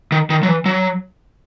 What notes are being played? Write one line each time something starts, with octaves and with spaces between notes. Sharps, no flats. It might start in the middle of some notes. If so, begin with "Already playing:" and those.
D#3
D#3
F#3
E3
F#3